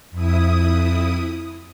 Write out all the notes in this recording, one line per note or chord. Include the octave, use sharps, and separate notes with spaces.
F2 E4 D#6